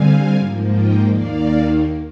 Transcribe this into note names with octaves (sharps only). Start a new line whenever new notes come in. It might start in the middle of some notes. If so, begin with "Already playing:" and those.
Already playing: D3 G3 C4 F5 G#5
G#2 F3 A#3
D#5 G5
D#2 D#3 A#3 D5 F5